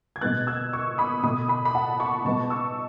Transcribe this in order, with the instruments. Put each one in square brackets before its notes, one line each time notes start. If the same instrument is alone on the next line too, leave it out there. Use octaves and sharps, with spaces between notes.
[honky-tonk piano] G#6
B2 G#3 B3 F#6 A6
E6 G#6
C#6 E6
B5 D#6
B2 A3 B5 D#6
B5 D#6
B5
F#5 A5
A5 C#6
B2 G#3 B3 A5 C#6
C#6 E6